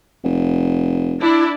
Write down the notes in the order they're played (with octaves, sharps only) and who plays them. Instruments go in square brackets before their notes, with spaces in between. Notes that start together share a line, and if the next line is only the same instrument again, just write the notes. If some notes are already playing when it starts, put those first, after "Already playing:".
[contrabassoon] F1
[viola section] D4 E4 D5